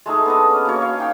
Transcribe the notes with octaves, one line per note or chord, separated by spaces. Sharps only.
G#3 A3 D#4 G#4
B3 D4 D#5
C#4
A#3 F#4 C#5
F5
D#4 G5 C6